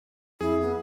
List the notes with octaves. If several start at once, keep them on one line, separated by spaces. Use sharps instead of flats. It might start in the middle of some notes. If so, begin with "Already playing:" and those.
F2 E4 G#4
B3